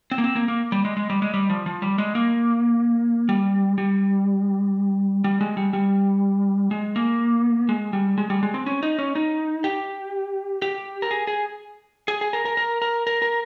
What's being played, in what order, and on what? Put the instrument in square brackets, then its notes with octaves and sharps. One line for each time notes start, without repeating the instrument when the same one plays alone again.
[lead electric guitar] C4
A#3
C4
A#3
A#3
G3
G#3
G#3
G3
G#3
G3
F3
F3
G3
G#3
A#3
G3
G3
G3
G#3
G3
G3
G#3
A#3
G#3
G3
G#3
G3
G#3
C4
C#4
D#4
C#4
D#4
G4
G4
A#4
G#4
G#4
G#4
G#4
A#4
A#4
A#4
A#4
A#4
A#4